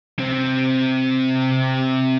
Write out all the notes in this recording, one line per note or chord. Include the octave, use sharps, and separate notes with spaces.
C3 C4